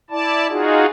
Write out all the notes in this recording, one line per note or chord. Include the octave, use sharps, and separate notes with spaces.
E4 D5 A5
D#4 F4 F#4 G#4